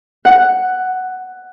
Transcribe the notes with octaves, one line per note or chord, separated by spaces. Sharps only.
F#5